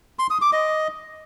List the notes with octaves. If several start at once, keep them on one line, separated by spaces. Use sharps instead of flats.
C6
D#6
D6
D#5